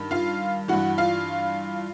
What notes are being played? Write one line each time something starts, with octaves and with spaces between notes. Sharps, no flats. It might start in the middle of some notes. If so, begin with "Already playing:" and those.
Already playing: G2 D#3
F4 F5
G2 E3 F#4 F#5
F4 F5